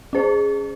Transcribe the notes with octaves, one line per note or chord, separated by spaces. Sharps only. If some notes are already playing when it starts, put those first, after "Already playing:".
C#4 G#4 C5